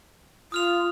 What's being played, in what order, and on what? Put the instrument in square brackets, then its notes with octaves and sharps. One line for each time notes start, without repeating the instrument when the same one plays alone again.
[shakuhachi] F4 [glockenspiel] D#6 F6 F7